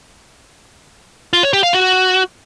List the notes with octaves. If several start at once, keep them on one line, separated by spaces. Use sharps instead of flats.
F4
C#5
G4
F5
F#4